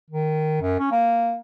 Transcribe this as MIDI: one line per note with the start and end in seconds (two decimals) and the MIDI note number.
0.10 0.58 51
0.61 0.79 42
0.79 0.87 61
0.91 1.36 58